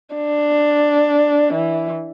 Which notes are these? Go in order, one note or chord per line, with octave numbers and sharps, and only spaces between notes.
D4
E3